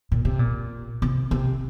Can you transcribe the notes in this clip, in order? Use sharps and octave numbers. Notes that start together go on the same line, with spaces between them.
A#2
C3
A#2
C3
C3